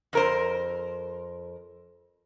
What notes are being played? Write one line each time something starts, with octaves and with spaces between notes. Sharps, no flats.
F2 A#4 C5